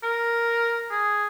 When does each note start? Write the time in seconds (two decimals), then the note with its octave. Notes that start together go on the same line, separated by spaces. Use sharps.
0.03 A#4
0.91 G#4